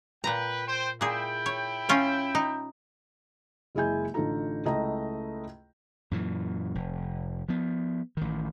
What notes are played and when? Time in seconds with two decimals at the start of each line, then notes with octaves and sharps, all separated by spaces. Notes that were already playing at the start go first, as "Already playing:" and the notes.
0.24 A#2 B4 G5 A#5
0.66 C5 G5
1.01 A#2 E4 G#4 G5
1.46 C#5
1.89 C#4 F4 C#5
2.35 D#4
3.75 F#1 G#3 E4 G#5 G6
4.14 A1 D3 D#4 F4 A4 A#5
4.65 C#2 A3 E4 D#5 A#5
6.11 F#2 A#2 E3
6.75 F1
7.49 F3 B3
8.17 A1 D#3